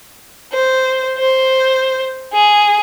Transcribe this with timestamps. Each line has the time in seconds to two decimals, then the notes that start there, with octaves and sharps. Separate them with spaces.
0.53 C5
1.18 C5
2.33 G#4